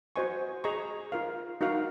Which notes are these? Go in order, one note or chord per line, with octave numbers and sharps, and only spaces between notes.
F#4 C5 D#5 G#5 C#6
G#4 D#5 A#5 C#6
F4 A#4 F5
D#4 F#4 A#4 F5